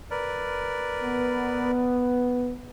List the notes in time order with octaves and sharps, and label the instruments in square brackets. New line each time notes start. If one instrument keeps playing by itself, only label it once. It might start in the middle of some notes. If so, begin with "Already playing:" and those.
[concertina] A#4 B4 D5
[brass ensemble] B3